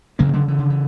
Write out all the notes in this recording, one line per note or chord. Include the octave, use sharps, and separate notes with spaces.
D2 C#3 F#3 A#3
D3 F#3
E3
D3
E3